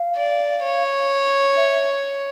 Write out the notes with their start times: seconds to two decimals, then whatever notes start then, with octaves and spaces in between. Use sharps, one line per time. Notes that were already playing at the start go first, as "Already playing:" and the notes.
Already playing: F5
0.16 D5
0.63 C#5
1.56 E5